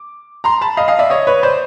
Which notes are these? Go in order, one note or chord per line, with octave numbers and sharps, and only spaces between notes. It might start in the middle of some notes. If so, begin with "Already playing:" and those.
Already playing: D6
A#5 C6
A5 B5
D#5 F5
D#5 F5
D5 E5
C#5 D#5
B4 C#5
C5 D5